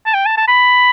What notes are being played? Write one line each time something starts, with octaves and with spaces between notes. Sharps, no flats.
A5
G5
A5
A5
B5